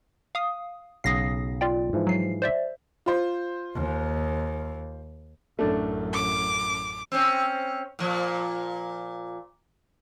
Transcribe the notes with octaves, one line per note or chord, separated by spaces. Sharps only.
F5 D#6
B1 C#3 F5 D#6 A#6 C7
F4 D5 G5
G#2 E3 F3
F#3 C7
C5 D5 E5
F4 C5
D#2
A1 F#2 A3 D4
D6
C4 C#4
A#2 F3